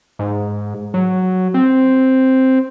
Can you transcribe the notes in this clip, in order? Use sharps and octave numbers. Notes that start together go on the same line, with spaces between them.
G#2
F#3
C4